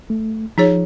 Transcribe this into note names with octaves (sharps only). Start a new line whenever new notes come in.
A3
F3 D#4 G#4 C#5